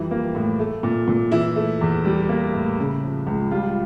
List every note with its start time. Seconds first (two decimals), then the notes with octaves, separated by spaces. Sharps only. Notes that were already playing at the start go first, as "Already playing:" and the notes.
Already playing: F2 E3 G3
0.11 A#3
0.35 A2
0.59 A3
0.83 A#2
1.08 A#2
1.32 E3 E4
1.56 A3
1.81 E2
2.05 G3
2.29 A#3
2.54 A2
2.79 C#3
3.03 F3
3.27 C#2
3.51 G3 F4